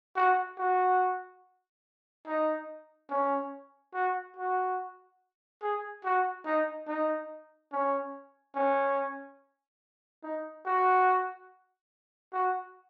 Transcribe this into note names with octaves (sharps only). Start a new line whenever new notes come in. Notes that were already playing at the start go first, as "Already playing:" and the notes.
F#4
F#4
D#4
C#4
F#4
F#4
G#4
F#4
D#4
D#4
C#4
C#4
D#4
F#4
F#4